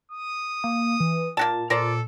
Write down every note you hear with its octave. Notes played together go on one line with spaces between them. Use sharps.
D#6
A#3
E3
A#2 A#3 F#4 A5
A#2 A4 A#4 C5 D5